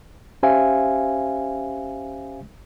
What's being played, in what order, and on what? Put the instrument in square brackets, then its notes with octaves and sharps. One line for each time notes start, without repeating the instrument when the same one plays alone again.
[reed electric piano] C#4 G4 C5 E5 F5 G#5